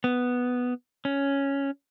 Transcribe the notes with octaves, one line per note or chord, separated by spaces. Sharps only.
B3
C#4